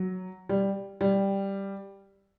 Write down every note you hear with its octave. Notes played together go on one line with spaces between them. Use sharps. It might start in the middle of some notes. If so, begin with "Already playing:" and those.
Already playing: F#3
G3
G3